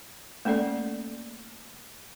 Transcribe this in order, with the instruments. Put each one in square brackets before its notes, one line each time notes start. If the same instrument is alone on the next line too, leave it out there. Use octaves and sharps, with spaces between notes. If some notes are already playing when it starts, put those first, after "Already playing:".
[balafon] A3 A#3 C#4 A4 D5